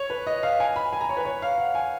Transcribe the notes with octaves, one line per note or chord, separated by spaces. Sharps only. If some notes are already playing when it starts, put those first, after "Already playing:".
Already playing: C#5
B4
D#5
F5
G#5
B5
G#5
A#5
C#5
B4
C#5
F5
F#5
G#5